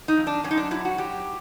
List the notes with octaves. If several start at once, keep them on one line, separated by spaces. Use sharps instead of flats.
D#4
F2
D4
F#2 C#4
D#4
D4
F#3 E4
F#4
F#3 G4